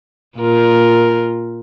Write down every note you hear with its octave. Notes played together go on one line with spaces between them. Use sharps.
A#2 F4 A#4